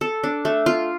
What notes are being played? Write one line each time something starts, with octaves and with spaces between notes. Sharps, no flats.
A4
D4
A3
F4